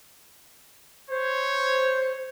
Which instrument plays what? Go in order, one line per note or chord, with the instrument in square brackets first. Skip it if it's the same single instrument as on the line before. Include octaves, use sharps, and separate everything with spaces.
[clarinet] C5 [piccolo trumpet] C#5